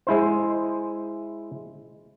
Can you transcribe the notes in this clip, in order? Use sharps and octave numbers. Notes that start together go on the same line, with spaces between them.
G#3 E4 C5